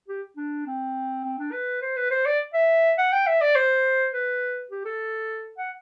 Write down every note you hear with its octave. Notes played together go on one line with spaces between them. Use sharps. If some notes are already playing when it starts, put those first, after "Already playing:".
G4
D4
C4
C4
D4
B4
C5
B4
C5
D5
E5
F#5
G5
E5
D5
C5
B4
G4
A4
F#5